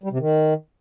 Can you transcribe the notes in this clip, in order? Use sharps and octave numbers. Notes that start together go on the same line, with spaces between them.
G3
C3
D#3